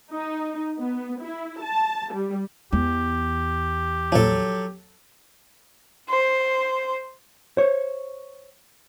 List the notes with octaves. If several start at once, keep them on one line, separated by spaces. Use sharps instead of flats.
D#4
B3
E4
A5
G3
E2 G4
A#1 F3 F#3 A4
C5
C5 C#5